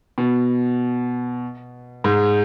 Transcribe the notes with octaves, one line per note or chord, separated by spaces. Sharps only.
B2
G#2